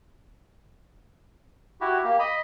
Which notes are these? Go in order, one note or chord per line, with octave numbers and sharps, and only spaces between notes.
E4 F#4 G4
A#3 G4
D#5 B5